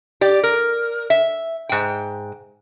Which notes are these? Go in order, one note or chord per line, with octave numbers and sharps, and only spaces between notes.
G4 D5
A#4
E5
G#2 G5